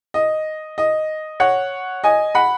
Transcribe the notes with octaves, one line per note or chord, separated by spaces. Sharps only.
D#5
D#5
C#5 F#5
D#5 G#5
F#5 B5